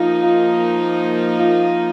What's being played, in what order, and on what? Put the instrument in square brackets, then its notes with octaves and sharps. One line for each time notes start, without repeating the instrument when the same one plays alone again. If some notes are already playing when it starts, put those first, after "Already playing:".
Already playing: [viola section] F3 A#3 D#4 [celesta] F4 F5
[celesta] F4 F5
F4 F5